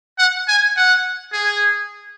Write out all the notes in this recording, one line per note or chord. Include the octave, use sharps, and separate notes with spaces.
F#5
G#5
F#5
G#4